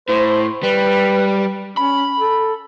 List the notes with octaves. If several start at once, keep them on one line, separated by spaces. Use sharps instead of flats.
A2 C5
G3 B4
C#4 B5
A4